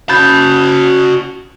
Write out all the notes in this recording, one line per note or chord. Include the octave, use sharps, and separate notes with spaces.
C#4 F#4 A5 B5 G6 A6